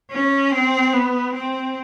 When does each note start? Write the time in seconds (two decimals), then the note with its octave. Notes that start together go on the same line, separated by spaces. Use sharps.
0.11 C#4
0.51 C4
0.93 B3
1.33 C4